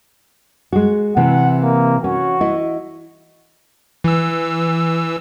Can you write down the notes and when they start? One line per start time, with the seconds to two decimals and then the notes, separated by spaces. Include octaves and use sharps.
0.72 G#3 F#4
1.17 C3 E3 C4 F#5
1.62 A#3
2.04 C#4 F#4
2.41 E4 D#5
4.04 E3 E6